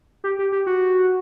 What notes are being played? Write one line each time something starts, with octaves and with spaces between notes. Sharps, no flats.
G4
G4
G4
F#4